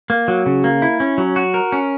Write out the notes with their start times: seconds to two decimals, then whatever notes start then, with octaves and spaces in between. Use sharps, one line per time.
0.10 A#3
0.28 F#3
0.46 C#3
0.64 A#3
0.82 E4
1.00 C#4
1.18 F#3
1.36 F#4
1.54 A#4
1.72 C#4